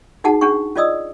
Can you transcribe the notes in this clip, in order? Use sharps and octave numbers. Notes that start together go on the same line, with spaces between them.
D#4 F#4 G#4 F#5 A5
C#4 D4 G#4 F#5 C#6
C#4 F4 D5 D#5 D#6 E6